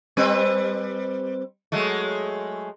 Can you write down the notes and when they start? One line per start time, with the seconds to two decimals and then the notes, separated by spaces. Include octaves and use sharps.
0.17 G3 C4 B4
1.72 F#3 G#3 A3